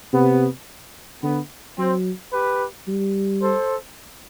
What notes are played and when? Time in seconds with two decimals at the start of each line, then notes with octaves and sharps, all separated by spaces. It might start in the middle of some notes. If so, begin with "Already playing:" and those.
0.13 C3 B3
1.23 D3 B3
1.78 F#3 C4
2.33 G4 B4
2.88 G3
3.43 A4 C5